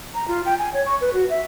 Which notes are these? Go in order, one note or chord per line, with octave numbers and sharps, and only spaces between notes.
A#5
F4
G5
G#5
C#5
C#6
B4
F#4
E5